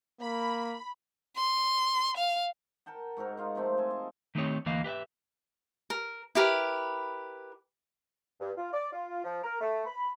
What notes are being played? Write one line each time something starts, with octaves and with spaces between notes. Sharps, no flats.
A#3 B5
C6
F5
A#4 F#5 G5 A5
G#2 F#4 A4 A#4
D#4 F4 F5
C3 F3 A3 C4
A4 G#5 A5
D#5
D#3 A3 C4 D#4 G4 C#5
D2 E3 A#3 D#5 F5
G4 B4 D#5 E5
A#4
E4 G4 A#4 B4
G2
F4
D5
F4
F3
A#4
A3
B5